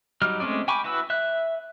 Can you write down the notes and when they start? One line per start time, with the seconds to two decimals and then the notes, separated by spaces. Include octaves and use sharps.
0.22 F#3 G3 D#4 F6
0.40 G#3 A3 C4 C#4 D5
0.68 G5 G#5 B5 C#6 D6
0.84 E4 F#4 B4 E6
1.10 E5 F#6